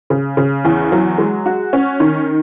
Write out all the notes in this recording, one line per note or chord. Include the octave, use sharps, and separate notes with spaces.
C#3
C#3
E2
F#3
G#3
F#4
C#4
D#3